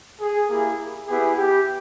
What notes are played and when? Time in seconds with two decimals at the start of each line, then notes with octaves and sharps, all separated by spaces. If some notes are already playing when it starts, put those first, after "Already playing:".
0.19 G#4
0.48 A#3 E4 G4 G#4
1.07 B3 E4 G4 G#4
1.36 G4